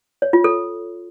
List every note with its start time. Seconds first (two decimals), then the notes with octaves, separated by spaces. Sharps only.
0.22 C#5
0.33 F4
0.44 A4